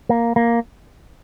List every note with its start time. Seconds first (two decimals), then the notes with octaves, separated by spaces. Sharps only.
0.09 A#3
0.36 A#3